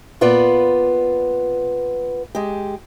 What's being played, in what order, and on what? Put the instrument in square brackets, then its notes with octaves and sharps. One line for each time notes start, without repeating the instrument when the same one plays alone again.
[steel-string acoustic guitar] A#2 B3 F4 B4 D5
G#3 G4